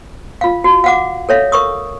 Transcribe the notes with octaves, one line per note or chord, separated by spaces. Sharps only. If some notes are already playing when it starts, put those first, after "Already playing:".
F4 F5
F#4
F5 F#5 D6
A4 C#5 E5 F5
A#4 C#6 D#6